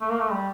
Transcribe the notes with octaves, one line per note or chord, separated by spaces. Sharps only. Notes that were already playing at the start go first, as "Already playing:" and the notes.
A3
A#3
A3
G3